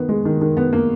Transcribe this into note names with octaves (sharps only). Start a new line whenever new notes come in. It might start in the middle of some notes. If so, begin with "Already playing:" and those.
Already playing: D#3 B3
G#3
D#3
D#3
B3
A#3